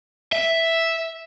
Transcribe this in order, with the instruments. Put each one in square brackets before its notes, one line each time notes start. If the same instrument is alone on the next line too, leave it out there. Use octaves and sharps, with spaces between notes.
[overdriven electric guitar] E5